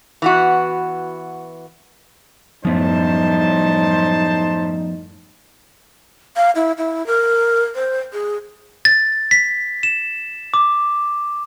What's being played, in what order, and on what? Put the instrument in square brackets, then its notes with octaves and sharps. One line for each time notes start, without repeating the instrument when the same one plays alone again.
[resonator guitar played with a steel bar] E3 B3 F#4
[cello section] F#2 A2 G3 [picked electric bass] F3 B3 [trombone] D#4 [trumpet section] C5 A5
[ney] F5
E4
E4
A#4
C5
G#4
[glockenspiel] A6
B6
E7
D6